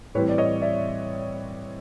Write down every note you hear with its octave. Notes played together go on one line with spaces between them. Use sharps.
A2 E3 G3 C4 B4 C#5
D5
C#5 D#5
D5 E5